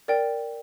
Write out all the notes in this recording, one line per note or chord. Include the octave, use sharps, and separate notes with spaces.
A#4 D5 G5